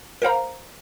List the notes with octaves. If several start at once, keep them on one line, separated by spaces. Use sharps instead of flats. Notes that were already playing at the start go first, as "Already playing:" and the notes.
A#4 C5 F5 A#5